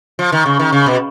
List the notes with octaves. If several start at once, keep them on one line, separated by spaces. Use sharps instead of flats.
F3
D#3
C#3
D#3
C#3
B2